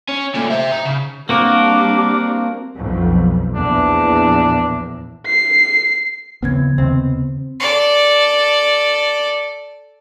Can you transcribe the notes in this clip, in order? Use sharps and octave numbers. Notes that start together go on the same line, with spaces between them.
C#4
A#2 A3
C5 E5
D#4
C#3
G3 A#3 C4 D4 F#4 A#4 D6
B1 F2
A#1 E2 D4
C7
A#1 D#2 C#3 E3 B3 C4 G#6
D#2 C3 D#3 B3 C4
A4 D5